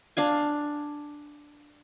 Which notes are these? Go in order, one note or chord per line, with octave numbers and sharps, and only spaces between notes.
D4 F5 G#5